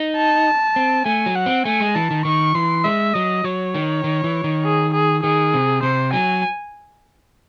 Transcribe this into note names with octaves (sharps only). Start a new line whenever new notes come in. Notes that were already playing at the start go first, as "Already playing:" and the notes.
Already playing: D#4
A5
C4
A3 G#5
F#3
F#5
C4
A3 G#5
G#3
E3 A5
D#3
D#3 C#6
E3 C6
G#3 E5
F#3 D#5
F#3 C#5
D#3
D#3
E3
D#3
G#4
G#4
D#3 G#4
C3
C3 C5
F#3 G#5